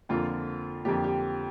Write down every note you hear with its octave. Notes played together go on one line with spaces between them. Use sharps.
F2 D3 F3 A#3 F4
F2 D3 F3 A#3 G4
G4